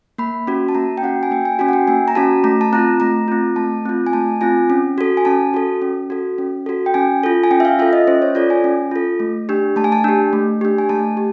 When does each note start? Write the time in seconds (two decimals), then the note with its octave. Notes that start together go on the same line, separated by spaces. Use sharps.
0.18 A#3 B5
0.47 C#4 F#4
0.69 A5
0.75 A#3 A#5
0.97 G5
1.03 C#4 F#4 F#5
1.23 G#5
1.31 A#3 G5
1.45 G#5
1.59 C#4 F#4 G#5
1.69 F#5
1.73 G5
1.87 A#3 G#5
2.08 A#5
2.15 C#4 F#4 A5
2.44 A3 A#5
2.61 A5
2.73 C4 F4 A#5
3.00 A3 A#5
3.28 C4 F4
3.56 A3 A5
3.85 C4 F4
4.06 G#5
4.13 A3 A5
4.41 C4 F4 G#5
4.70 C#4
4.98 F#4 A4
5.17 G#5
5.25 C#4 A5
5.54 F#4 A4
5.82 C#4
6.10 F#4 A4
6.38 C#4
6.66 F#4 A4
6.86 G5
6.94 C#4 G#5
7.24 F4 A4
7.44 G#5
7.51 C#4 G5
7.60 E5
7.65 F5
7.79 F4 A4 E5
7.93 D#5
8.07 C#4 C5
8.22 C#5
8.35 F4 A4 D5
8.50 G#5
8.64 C#4
8.91 F4 A4
9.20 A3
9.49 D4 G4
9.76 A3 A5
9.84 G#5
9.92 A5
10.04 D4 G4
10.33 A3
10.61 D4 G4
10.78 G#5
10.89 A3 A5
11.17 G4